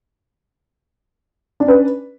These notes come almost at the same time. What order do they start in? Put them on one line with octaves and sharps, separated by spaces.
D4 C#4 B4